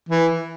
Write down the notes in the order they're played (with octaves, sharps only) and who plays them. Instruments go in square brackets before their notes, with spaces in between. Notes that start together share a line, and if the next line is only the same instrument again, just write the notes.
[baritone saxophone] E3